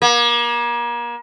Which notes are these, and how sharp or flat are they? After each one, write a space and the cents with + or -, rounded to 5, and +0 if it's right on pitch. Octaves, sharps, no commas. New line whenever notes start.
A#3 +35